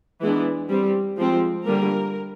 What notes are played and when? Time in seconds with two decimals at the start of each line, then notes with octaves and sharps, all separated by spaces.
0.21 E3 G#3 B3 D4
0.69 G3 C4
1.17 F3 G#3 C4
1.66 D3 G3 A#3 A#4